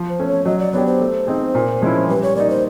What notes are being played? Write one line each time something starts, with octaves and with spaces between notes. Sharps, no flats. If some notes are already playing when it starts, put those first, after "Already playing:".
Already playing: F3
C5
A3 C#4
C#5
F#3 D#5
D5
B3 D4 G4 C#5
C5
A3
C4 D#4 G#4
A#2
F3 G#3 C#4 E4
G3 B4
C#5
A#3 D#4 D5
C5